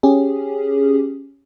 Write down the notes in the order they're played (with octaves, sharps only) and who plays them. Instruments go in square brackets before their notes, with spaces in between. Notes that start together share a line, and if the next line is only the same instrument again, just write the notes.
[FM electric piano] C#4 G4 G#4